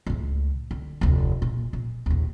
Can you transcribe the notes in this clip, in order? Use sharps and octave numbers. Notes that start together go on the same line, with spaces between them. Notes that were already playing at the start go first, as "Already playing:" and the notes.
C#2 A2
D3
F1 D2
A#2
A#1
A#1 D#2